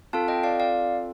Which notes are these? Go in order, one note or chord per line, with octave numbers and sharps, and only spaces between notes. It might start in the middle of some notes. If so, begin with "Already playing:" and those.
C4 F4 A4 F5 A5
D#5 G5
D5 F5
D5 F5